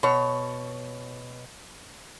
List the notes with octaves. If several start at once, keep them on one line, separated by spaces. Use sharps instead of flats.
B2 C#5